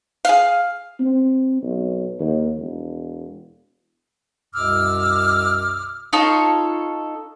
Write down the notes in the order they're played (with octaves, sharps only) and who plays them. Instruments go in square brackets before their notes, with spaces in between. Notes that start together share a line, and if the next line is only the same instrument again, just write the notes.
[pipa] G#4 F5
[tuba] C4
B1
D#2
E1
[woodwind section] C2 F#2 B2 D6 E6 F6
[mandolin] D#4 F4 A4 C#5